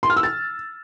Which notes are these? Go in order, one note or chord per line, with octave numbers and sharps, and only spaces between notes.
C6
F6
E6
A6